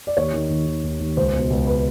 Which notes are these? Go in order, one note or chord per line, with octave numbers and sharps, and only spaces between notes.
D5
D#2 C#5
D#3
D#2
D#3
D#2
D#2
C#2 C5
B2
C#2
B4